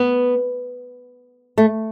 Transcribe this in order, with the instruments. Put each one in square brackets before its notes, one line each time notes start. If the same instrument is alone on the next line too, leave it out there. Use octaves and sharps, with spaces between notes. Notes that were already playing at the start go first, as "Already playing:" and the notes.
Already playing: [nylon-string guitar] B3
A3